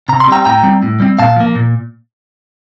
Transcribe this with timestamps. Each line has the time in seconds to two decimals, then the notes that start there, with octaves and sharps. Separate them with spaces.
0.09 C3 A#5
0.20 C6
0.27 G3 C4 G5 A#5
0.45 A2 G5 A#5
0.63 G3 C4
0.83 A2
1.00 G3 C4
1.19 A#2 F5 A5
1.36 F3 A#3
1.55 A#2